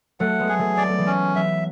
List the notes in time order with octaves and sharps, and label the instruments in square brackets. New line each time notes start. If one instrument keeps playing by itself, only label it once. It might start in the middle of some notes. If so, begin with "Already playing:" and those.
[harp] F#3 A3 [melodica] F#5
[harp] G#3 B3
[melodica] G#4
[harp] F#3 A3
[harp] G#3 [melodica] D5
[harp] A3
E3 G#3
[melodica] C#4
[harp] F#3 [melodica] E5